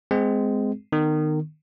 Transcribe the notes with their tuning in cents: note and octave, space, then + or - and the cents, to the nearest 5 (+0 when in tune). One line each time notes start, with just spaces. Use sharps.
G#3 +0 C4 -25 G#4 +0
D#3 -25 B3 +15